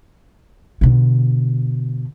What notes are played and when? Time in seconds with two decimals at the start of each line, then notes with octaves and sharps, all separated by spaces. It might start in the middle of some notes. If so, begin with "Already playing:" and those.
0.81 B2 D3